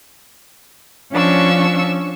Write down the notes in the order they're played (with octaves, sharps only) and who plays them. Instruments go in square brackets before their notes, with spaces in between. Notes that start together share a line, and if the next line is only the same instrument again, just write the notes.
[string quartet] F3 C#4 D4 C#6 E6